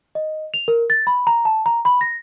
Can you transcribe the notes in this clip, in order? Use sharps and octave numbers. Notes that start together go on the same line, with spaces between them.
D#5
F7
A#4
A6
B5
A#5
A5
A#5
B5
A#6